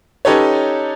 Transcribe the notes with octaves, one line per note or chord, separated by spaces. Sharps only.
C#4 D#4 G4 A4 B4 C#5